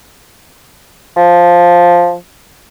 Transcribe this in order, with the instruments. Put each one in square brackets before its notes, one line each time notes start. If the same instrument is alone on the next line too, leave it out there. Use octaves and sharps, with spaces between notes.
[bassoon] F3